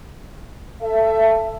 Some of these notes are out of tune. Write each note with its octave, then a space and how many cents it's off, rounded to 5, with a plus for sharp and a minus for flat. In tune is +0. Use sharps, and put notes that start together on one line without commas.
A4 +5 E5 +20